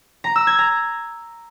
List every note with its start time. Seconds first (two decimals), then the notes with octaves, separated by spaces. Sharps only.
0.24 A#5
0.36 E6
0.47 G#6
0.58 A#5